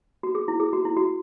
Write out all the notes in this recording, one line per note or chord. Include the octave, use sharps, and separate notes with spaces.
F#4
G#4
E4
G#4
F#4
E4
F#4